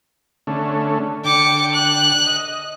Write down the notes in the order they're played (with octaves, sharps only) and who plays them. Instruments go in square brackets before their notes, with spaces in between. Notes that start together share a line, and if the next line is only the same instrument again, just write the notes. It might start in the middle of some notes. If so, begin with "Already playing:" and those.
[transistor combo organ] D3 A3 C#4
[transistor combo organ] D3 G5 [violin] D6 C#7
[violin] F#6
[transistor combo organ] D#5